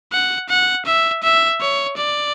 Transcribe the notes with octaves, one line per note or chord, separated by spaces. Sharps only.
F#5
F#5
E5
E5
C#5
D5